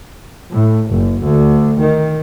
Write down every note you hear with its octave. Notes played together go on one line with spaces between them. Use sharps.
A2
F#1
D2
D#3